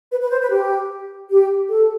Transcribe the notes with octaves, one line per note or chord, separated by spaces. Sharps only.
B4
B4
C5
B4
G4
G4
A4